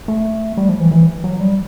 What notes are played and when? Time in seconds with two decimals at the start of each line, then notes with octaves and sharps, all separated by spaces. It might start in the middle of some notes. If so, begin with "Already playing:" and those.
0.08 A3
0.57 G3
0.69 F3
0.80 E3
0.91 E3
1.24 F#3
1.40 G3